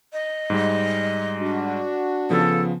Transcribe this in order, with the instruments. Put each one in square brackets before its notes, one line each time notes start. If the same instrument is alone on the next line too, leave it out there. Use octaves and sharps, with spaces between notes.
[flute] D#5
[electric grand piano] G#2 G3 G#3
[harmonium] D4 F#4
[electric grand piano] C#3 F3 B3 [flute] A4